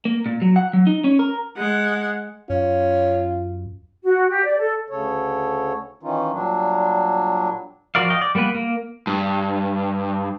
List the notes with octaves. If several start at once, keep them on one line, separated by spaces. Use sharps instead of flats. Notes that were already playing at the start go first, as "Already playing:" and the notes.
A#3
A#2
F#3
F#5
F#3
D#4
C#4
A#4
G#3 F#5
F#2 C#4 F4
F#4
G4
D5
A4
D2 C#3 A4 C#5
D#3 E3 C#4 D#4 F4
A#2 F#3 G3 D4
F3 F#4 A#4 D5 F5
D#5 F5 G5
D5
G3 A#3 B3 B4
A#3
G2